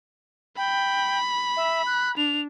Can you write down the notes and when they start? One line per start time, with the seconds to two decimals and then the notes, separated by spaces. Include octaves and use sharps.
0.57 G5 B5
1.57 E5
1.86 F#6
2.17 D4 F7